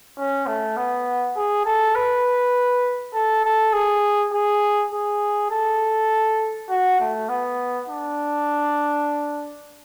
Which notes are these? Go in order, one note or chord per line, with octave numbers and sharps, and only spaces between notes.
C#4
A3
B3
G#4
A4
B4
A4
A4
G#4
G#4
G#4
A4
F#4
A3
B3
D4